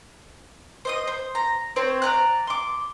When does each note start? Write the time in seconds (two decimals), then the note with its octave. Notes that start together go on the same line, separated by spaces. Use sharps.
0.85 C5 D#5 D#6
1.07 C5
1.35 A#5
1.76 C4 C5 C#5
2.02 D5 A#5 F#6
2.47 C6 D6